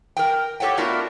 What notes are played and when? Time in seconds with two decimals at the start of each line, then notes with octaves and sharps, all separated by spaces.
0.17 A#4 G5
0.60 G4 A4 C#5 F#5 G5
0.77 A3 B3 D4 F4 F#4 A#4